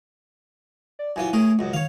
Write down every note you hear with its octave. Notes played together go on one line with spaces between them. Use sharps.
D5
F#2 E3 F4 G#5
A3 C#4 G#4 A#4
C#2 F#2 D#5
D#3 C#5 F5